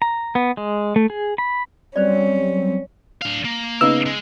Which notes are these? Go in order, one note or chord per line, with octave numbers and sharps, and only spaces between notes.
A#5
B3
G#3
A3
G#4
B5
F#3 G3 C4 C#4 C5 D5
D4 F5
A#3
C#3 B3 D#4 E6
G#3